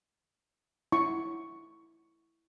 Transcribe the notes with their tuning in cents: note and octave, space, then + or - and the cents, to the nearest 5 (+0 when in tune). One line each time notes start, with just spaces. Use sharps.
E4 +0 C#6 +0